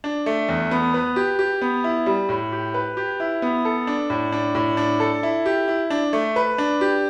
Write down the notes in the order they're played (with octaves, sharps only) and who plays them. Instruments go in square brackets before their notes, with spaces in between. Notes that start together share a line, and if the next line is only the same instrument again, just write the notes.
[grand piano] D4
A3
E2
B3
B4
G4
G4
B3
E4
G3
A2
G4
B4
G4
E4
B3
A4
D4
A2
D4
A2
D4
A4
E4
G4
E4
D4
A3
B4
D4
G4